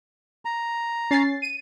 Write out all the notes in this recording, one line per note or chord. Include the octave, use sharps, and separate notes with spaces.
A#5
C#4 A6 C7
D#7